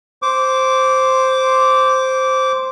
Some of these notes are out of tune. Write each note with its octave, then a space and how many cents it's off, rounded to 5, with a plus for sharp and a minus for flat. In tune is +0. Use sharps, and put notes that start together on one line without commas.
C5 +0 D6 -15